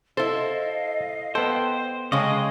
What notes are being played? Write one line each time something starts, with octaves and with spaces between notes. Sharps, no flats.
E4 A4 C5 D#5 F5
B3 A4 C5 G5
C#3 G#3 D#5 F5 G5 A5